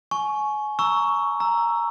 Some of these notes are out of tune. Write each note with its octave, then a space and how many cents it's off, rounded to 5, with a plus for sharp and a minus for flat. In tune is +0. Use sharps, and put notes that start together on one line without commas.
G#5 +30 C#6 +0
A#5 +0 C#6 +10 E6 +0
A#5 +0 E6 +10